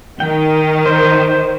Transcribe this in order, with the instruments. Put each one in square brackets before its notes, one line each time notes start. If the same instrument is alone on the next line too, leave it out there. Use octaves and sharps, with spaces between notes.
[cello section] D#3 [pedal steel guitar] G5
[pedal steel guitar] C5